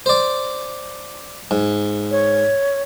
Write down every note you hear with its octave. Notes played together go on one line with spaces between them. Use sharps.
C5 D5
G#2
C#5